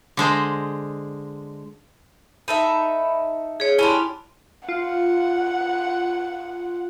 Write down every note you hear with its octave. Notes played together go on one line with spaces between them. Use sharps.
D3 G#3 C5 D#5
D#4 A4 E5 B5
G#4 C#5
C#4 D4 E4 G4 B5 C6
F4 F#5